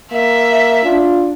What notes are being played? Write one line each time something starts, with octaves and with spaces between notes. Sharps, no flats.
A#3 E5
D4 F4